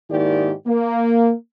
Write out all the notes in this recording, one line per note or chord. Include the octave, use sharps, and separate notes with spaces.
G#2 D#3 A#3 E4 G4 D5
A#3